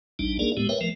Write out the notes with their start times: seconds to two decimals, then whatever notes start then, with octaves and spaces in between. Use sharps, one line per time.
0.19 A1 G3 D4 D#4
0.39 A#3 D4 D#4 G#4 A#4 D5
0.57 A2 G#3 B3 G4
0.69 A#4 B4 C#5 E5 G5
0.81 F3 A3 A#4